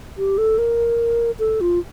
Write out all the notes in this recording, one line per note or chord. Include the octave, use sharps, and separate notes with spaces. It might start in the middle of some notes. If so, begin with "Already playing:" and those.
G4
A4
A#4
A4
F4